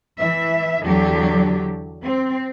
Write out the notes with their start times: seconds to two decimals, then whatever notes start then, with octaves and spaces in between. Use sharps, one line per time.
0.18 E3 E5
0.84 E2 D3 F#3 G4
2.03 C4